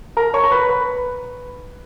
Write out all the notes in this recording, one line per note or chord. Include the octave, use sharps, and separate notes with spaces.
A#4 A#5
C#5 C#6
A#5
B4 B5
B4 B5